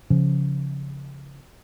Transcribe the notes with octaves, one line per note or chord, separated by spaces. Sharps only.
C#3 F3 C#4